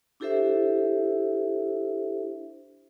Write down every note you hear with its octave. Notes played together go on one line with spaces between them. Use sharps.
D4 E4 G4 A4 C5 E5